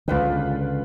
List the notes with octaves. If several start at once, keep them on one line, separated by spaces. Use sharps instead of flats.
C#2 D3 F4 B4 G5